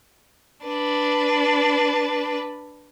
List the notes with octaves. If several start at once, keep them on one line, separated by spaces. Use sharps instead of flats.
D4 B4